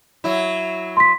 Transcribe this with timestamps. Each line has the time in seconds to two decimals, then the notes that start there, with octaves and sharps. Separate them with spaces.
0.24 F#3 E4
0.97 C6 B6